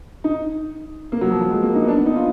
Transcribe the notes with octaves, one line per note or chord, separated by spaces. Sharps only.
D#4
A#3
F#3
F3
F#3
G#3
A#3
D#4
B3
D4
B3
D#4
F4